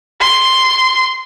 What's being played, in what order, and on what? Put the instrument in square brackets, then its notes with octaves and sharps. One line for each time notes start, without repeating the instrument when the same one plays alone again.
[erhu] C6